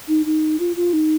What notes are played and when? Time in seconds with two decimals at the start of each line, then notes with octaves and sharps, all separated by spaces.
0.08 D#4
0.25 D#4
0.59 F4
0.76 F4
0.93 D#4